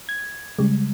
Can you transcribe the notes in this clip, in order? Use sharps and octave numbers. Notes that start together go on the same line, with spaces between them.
G#6
C#3 G3 G#3